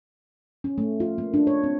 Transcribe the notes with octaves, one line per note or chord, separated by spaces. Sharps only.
C#4
A3
F4
A#3
D4
C#5
C4